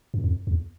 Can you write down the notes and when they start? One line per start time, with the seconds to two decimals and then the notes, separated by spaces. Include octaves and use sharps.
0.14 F#2
0.24 F2
0.47 E2